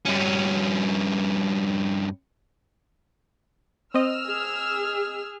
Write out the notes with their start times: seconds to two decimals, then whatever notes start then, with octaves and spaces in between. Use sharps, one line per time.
0.06 G2 C#4
3.94 C4 D#5 E6 F6
4.27 G#4